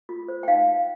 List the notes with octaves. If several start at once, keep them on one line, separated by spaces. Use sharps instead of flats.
F4
C5
G5
D#4 F5